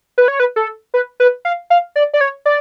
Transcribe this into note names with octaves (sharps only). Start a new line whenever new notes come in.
B4
C#5
B4
A4
B4
B4
F5
F5
D5
D5
C#5
D5